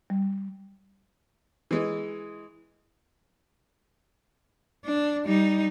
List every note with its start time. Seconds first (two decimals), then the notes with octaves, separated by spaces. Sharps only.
0.10 G3
1.71 E3 G#3
4.85 D4
5.26 G3 D#4